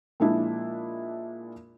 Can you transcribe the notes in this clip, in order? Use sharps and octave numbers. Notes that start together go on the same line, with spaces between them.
A#2 F3 G#3 D4 E4